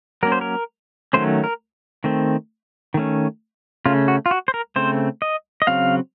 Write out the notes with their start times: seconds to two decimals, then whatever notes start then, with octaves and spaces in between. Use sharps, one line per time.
0.23 F#3 A#3 C#4 A#4
0.32 C5
0.41 A#4
1.13 D#3 F#3 A3 C#4 C5
1.44 A#4
2.04 D#3 A3 C4
2.94 D#3 A3 C#4
3.86 C#3 A3 C#4 F4
4.08 F#4
4.26 F4
4.31 F#4
4.48 C5
4.54 A#4
4.76 C#3 A3 C4 C5
5.22 D#5
5.62 D#5
5.67 C#3 F#3 C4 F5